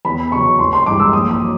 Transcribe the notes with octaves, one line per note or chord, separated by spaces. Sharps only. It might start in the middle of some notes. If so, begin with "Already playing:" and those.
E2 B5
C#3 F#3 C#6
A1 C6
C6
G2 E3 G#3 D6
E6
A#1 D#6
D6
F#3